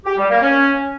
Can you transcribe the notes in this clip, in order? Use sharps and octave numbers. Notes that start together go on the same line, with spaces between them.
G4
G3
A#3
C#4